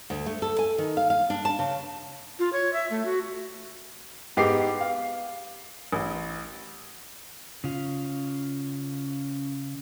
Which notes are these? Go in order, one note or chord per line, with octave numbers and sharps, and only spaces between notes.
D2
A3
A4
G#5
D#3
F5
F5
D4
A5
C#3
F4
C#5
E5
A3
F#4
G#2 B3 G4 D#5 D6 C7
F5
A1
C#3 F4